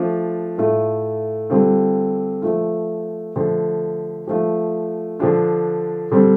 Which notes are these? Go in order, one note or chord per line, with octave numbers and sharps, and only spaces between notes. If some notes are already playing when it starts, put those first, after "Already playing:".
Already playing: F3 A3 D4 F4
A2 A3 F4
D3 G3 C4 F4
F3 A3 F4
D3 F3 A3
F3 A3 F4
D3 F3 D4 F4
D3 G3 C4